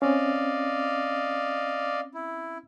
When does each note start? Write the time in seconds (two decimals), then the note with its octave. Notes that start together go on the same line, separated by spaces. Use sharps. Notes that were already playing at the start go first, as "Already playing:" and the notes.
0.02 C4 C#4 D5 D#5 F5
2.14 E4